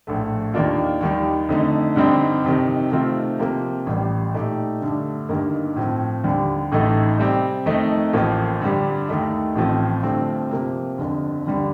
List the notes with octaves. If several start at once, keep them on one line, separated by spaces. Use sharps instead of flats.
A#1 A2 A3
D#2 D#3 A#3 D4 F4
D#2 D#3 G3
F2 D3 A3 D#4
G2 D3 G3 C4 D#4
F2 C3 D#3
C3 D#3 A3 C4 F4
C3 F3 A#3
A1 A2 G3
A#2 A3 D#4 G4
G2 D3 A3
G1 G2 D#3 A#3
A2 F3 C4
D#2 D3 G3
A1 A2 A3 D#4 A4
C3 G3 C4
F2 D#3 A3 D#4
A1 A2 F3 A#3
G2 D3 G3
D#2 D#3 A3 D#4
A1 A2 F3 C4 F4
G1 G2 F3 A3 C4
C3 F3 A#3
G1 F2 D3
D#2 D3 G3